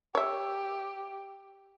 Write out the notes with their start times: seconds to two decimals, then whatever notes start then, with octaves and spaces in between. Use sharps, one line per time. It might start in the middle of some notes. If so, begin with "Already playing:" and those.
0.15 G4 C#5 E5